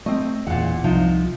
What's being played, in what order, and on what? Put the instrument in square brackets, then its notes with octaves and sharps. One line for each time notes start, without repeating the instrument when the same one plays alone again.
[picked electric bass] A3 C4 [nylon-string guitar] D#5
[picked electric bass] E1 E2 [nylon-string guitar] A#2 F#5
[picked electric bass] C2 [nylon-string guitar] C3 F3 D#4